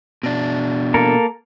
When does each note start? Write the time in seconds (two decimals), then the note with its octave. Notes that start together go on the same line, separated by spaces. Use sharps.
0.23 B2 D4
0.94 A#3 A4 A#4